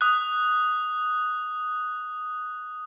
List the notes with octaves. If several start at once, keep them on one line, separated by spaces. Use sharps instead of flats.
D#6 F#6